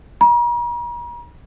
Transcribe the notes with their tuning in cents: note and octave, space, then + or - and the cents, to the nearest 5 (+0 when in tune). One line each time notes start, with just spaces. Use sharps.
A#5 +45